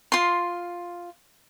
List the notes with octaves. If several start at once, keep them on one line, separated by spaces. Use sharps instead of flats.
F4 C6